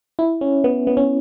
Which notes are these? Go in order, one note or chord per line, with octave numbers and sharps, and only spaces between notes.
E4
C#4
B3
B3
C#4